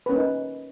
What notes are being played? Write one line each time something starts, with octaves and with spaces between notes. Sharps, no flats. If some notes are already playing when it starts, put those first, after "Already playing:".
A#3 C#4 D#4 B4